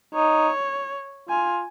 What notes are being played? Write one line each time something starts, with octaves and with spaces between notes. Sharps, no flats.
D#4 C#5
F4 G#5